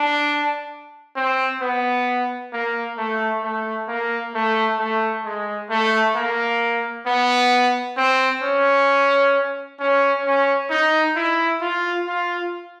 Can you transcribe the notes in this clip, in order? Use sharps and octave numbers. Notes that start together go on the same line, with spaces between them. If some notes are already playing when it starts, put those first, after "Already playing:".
Already playing: D4
C4
B3
A#3
A3
A3
A#3
A3
A3
G#3
A3
A#3
B3
C4
C#4
C#4
C#4
D#4
E4
F4
F4